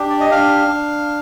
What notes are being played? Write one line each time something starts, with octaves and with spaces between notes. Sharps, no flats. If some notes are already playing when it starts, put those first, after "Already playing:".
Already playing: D4 G4
D5
D#5
D4 F5
D4